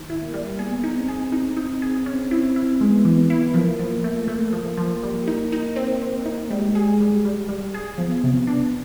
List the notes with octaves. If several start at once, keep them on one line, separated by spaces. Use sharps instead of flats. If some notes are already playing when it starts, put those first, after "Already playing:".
Already playing: D#3
E4
A#3
G3
B3 G#4
D#4
C4
G#4
C4 D#4
D#4
G#4
C4 C#4
E4
E4
G#3 B3
E3
B3
E4
F3 A#3
F3
A3
A3 A#3
F3
F3
G3
D#4
D#4
C4
C4
D#4
G3 G#3
G#4
G3
G3
G3
G#4
F3 B3
C3
D4